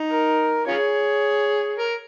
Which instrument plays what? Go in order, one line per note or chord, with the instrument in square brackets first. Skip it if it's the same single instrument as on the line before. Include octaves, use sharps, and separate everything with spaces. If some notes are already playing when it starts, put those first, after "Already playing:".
Already playing: [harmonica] D#4
[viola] A#4
[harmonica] C#4 F4 G#4 [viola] C#5
[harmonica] A#4